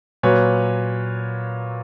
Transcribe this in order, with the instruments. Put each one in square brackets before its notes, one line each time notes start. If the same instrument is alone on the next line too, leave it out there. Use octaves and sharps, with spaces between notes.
[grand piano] A#2 F#3 B4 C#5